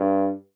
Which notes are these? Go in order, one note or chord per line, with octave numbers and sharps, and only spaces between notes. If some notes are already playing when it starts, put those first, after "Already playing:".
Already playing: G2